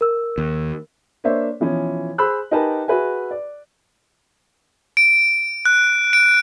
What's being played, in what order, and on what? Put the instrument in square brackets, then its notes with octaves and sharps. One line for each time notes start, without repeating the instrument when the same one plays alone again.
[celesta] A#4 E6
[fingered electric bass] D#2
[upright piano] A#3 D4 C5 C#5 E5
B2 E3 F3 C#4
G#4 C5 B5 E6 F#6
D#4 G4 A#4 B4 G#5 A5
F#4 G#4 B4 E5 G#5
D5
[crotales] D7
F#6
D7